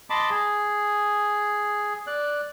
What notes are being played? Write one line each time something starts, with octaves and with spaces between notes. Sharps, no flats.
D#5 A5 B5 C6 D6
G#4
D5 F#6